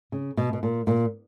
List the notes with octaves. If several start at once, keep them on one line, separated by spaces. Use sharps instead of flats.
C#3
B2
B2
A#2
A#2